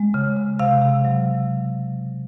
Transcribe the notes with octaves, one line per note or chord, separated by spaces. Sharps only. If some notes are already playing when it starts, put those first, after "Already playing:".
Already playing: G#3
C#3
C#3
C3 F5
C3
F#3